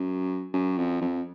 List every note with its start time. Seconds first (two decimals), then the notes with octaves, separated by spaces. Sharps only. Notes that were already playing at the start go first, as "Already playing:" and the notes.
Already playing: F#2
0.53 F#2
0.78 F2
1.01 F2